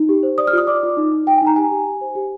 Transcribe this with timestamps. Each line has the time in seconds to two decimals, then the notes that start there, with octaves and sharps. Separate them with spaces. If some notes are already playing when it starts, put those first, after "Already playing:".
Already playing: D#4
0.09 G4
0.23 C5
0.38 D5 D#6
0.47 F6
0.53 F4 D#6
0.67 D5 D6
0.83 F4
0.97 D#4
1.12 D#4
1.26 D#4 G5
1.37 G#5
1.42 D#4 A#5
1.56 G4 G#5
1.71 G4
1.86 G4
2.01 C5
2.15 G4